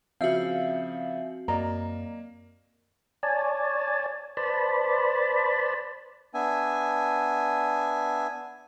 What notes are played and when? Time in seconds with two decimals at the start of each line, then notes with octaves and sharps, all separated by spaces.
0.21 C#3 F3 C4 F#4 E5 F5
1.48 F#2 A#3 D5 D#5 A#5
3.23 C#5 D5 G#5 A5
4.37 B4 C5 D5 A5 B5
6.34 B3 D4 E5 G#5